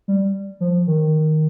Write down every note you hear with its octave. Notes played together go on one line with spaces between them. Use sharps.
G3
F3
D#3